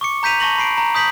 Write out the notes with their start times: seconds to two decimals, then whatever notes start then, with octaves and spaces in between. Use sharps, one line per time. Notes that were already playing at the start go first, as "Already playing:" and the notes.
0.01 C#6 D6 C#7
0.23 A#5 G6 B6 D#7 F7
0.40 A5 C#6 A#6 F#7
0.58 B5 C7 D7
0.78 A#5
0.95 D#6 G6 B6 F#7